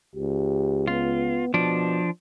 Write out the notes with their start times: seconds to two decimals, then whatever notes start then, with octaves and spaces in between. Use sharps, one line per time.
0.15 C#2 G4
0.87 B3 F4
1.54 B2 F3 D4